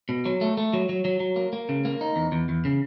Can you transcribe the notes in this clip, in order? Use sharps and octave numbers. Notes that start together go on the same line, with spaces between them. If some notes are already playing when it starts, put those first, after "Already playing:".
B2
F#3
A3
A3
F#3
F#3
F#3
F#3
A#3
A#3
C#3
A#3
D#4
E2
E2
E2
C#3